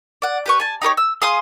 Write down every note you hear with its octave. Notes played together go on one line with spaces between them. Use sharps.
D5 F#5
G4 B4 C#6
G#5 A5
D#4 G4 A#4 C#5
E6
G#4 F5 C6 D#6